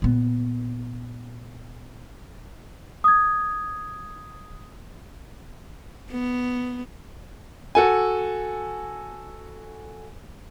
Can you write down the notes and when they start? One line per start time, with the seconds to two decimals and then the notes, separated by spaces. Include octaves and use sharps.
0.02 A#2 B3
3.04 D#6 G#6
6.10 B3
7.75 F#4 A4 G#5